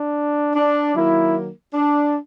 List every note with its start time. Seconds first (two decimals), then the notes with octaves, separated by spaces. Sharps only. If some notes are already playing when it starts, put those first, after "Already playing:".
Already playing: D4
0.54 D4
0.94 D#3 F#3 A#3 E4
1.74 D4